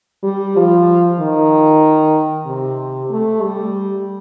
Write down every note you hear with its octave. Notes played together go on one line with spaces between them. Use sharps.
G3
F3
D#3
C3
A3
G3